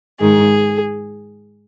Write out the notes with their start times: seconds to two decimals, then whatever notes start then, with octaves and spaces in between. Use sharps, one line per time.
0.20 G#2 D#3 G#4